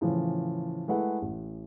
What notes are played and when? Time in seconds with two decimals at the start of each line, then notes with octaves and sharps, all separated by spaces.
0.01 A2 C#3 E3 F3
0.88 G#3 A3 E4 B4 F#5
1.22 A1